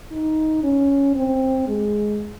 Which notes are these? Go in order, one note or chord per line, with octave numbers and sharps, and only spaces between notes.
D#4
C#4
C4
G#3